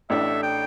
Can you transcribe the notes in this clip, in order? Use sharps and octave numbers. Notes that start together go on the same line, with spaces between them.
A1 A2 A3 D4 E5
G5